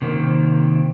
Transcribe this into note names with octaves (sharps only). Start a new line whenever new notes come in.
C3 D#3 A#3 C4